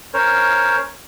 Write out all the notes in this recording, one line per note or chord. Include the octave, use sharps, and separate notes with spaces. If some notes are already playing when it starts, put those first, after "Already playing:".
C#4 A#4 C5 C#5